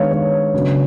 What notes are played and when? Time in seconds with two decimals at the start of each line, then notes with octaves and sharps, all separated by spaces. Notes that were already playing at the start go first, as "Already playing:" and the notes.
Already playing: D#3 G#3 B3 D4 C#5 F5
0.11 C#5
0.53 C#3 F#3 B3 D4